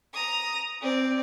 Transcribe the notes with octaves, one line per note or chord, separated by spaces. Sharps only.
A#5 D#6
C4 D5